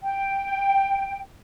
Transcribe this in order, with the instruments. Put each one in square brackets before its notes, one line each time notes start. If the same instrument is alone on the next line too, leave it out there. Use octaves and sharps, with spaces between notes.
[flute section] G5